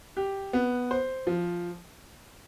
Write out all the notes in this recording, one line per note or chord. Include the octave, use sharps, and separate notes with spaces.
G4
B3
C5
F3